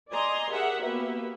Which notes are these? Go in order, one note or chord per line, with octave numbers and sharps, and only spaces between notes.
D5 D#5 G#5 A#5 C6
G4 G#4 A#4 E5 F#5
A#3 B3 F#4 G4 B4 E5